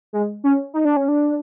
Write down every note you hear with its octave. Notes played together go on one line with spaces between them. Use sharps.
G#3
C#4
D#4
D4
C#4
D4